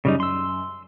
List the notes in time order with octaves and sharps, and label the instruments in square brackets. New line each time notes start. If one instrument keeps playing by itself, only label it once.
[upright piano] F#2 [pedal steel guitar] C#3 G3 D#4
[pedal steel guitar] C6 E6